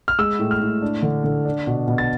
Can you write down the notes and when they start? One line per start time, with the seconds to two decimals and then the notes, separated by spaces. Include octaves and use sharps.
0.08 F6
0.19 G#3 E6
0.39 A2
0.51 F6
0.61 A2
0.82 D4
1.03 D3
1.24 D3
1.45 D4
1.67 B2
1.88 B2
1.98 A6